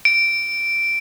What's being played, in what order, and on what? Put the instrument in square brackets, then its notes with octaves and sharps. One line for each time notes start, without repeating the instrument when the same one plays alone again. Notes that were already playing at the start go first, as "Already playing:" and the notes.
[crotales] D7